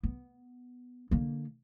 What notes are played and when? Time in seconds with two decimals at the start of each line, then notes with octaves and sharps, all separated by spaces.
0.03 B3
1.11 D3 A#3